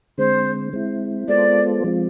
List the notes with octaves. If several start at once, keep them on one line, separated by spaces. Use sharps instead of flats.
D3 G#3 C4 C5
G#3 C4 E4
G#3 B3 F4 A4 C5 D5
F3 G#3 C4 F4